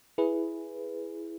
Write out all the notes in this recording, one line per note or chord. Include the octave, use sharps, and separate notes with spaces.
E4 G#4 B4